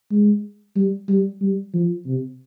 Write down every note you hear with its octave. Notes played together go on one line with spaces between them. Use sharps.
G#3
G3
G3
G3
F3
C3